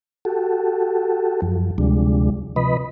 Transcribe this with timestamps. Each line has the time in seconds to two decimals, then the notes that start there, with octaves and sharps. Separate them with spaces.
0.25 F#4 G4 A4
1.42 F#2 F3
1.78 D2 C3 F3 G3 G#3 D4
2.56 C3 F3 B4 D#5 B5